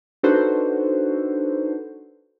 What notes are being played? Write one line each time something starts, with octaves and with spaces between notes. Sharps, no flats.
D4 D#4 F#4 A4 B4 C5